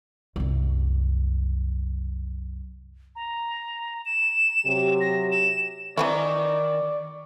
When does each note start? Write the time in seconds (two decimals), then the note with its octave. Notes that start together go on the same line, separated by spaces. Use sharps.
0.36 C2 F#2
3.16 A#5
4.05 E7
4.66 C3 F#3 G4
5.01 A#6
5.32 E7
5.97 D#3 E3 C4 E4 D5 A#5 C#6